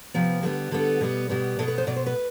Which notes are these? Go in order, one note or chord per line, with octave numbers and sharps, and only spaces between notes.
C3 F3 B3
D3 G3 B3 B4
D3 G3 B3 A4
B2 G3 B3
B2 G3 B3
B2 B3 A4
B4
C5
B2 B3 D5
C5
B4